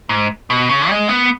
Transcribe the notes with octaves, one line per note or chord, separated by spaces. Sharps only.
G#2
B2
C#3
G#3
B3